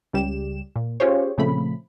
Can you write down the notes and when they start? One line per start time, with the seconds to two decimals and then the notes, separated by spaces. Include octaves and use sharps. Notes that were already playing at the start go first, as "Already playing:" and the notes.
0.13 C#2 C#3 G3 G4 E7
0.76 A#2
1.00 C#4 F4 G4 G#4 C5 C#5
1.38 A#2 C#3 F3 A3 C4 B5